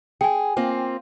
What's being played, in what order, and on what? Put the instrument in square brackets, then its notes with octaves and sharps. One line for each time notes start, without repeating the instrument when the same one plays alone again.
[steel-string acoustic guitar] G#4 [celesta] G5 G#5
[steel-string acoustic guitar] A#3 C4 F4